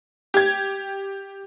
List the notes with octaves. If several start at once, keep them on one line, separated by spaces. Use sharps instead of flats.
G4 G#6